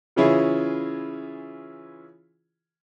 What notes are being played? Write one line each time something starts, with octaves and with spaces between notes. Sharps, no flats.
C#3 E3 C#4 E4 F4 G#4